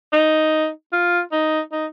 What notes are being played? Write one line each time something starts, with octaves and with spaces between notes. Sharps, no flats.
D#4
F4
D#4
D#4